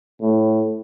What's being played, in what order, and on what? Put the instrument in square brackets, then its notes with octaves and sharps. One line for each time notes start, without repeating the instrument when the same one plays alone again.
[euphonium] A2